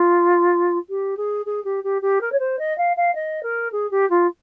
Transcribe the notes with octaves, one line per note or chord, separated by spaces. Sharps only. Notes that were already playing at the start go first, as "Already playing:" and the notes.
Already playing: F4
G4
G#4
G#4
G4
G4
G4
A#4
C#5
C5
D#5
F5
F5
D#5
A#4
G#4
G4
F4